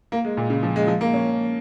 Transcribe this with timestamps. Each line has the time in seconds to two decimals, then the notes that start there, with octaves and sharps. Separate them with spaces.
0.12 A#3
0.25 G#3
0.37 A#2
0.50 C#3
0.63 F3
0.76 G#3
0.87 F3
1.01 A#3
1.14 C#4